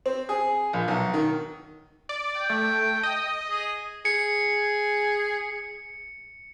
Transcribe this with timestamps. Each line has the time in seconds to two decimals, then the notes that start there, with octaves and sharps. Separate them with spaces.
0.06 C4
0.29 G#4
0.73 A#1
0.88 B1
1.14 D#3
2.09 D5
2.36 G5
2.50 A3
3.03 D#5
3.50 G#4
4.05 G#4 C#7